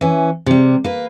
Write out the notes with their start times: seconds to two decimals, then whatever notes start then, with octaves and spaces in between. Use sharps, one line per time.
0.01 E3 C#4
0.46 C3 G3
0.84 A#3 B4